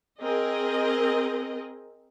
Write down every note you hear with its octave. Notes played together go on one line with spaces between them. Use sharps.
C4 G#4 A#4 D#5